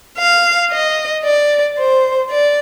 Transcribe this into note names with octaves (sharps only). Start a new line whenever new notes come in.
F5
D#5
D5
C5
D5